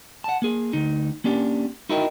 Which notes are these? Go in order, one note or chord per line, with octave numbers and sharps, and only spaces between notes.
F#5 A5
A#3 G#4
D2 D#4
A#3 C#4 D4 G4
D#4 E4 F#4 A#4 D#5 G5